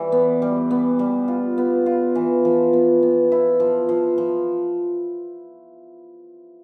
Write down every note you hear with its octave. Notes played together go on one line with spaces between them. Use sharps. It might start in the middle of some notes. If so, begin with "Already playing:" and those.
Already playing: E3 G3
B3
G3
B3
G3
F4
B3
F4
E3
F3
B3
B3
E4
F3
F3
F3